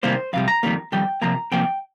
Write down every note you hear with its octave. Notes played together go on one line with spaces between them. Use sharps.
C3 D#3 G3 A#3 C5
F2 C3 G3 F5
A#5
F2 D#3 G3 A#3
F2 D#3 G3 G5
C3 F3 A#3 A#5
C3 F3 A#3 G5